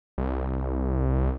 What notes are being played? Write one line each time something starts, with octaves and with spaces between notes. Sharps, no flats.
C2